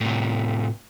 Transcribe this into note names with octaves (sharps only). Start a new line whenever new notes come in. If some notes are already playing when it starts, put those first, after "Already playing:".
A2 C3